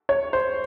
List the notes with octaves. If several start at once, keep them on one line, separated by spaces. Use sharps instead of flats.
C#5
C5